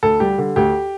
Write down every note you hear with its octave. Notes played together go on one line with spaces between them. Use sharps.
D2 A4
G3 G4
D3
D2 G4